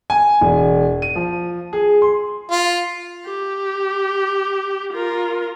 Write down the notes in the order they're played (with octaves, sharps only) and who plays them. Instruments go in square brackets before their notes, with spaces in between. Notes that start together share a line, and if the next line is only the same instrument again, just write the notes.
[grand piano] G#5
E1
D#7
F3
G#4
C6
[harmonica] F4
[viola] G4
F4 A#4